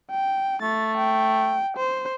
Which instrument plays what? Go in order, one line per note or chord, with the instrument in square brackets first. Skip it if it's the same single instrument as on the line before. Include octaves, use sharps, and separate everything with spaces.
[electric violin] G5
[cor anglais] A3 [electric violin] A6
[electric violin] G5
C5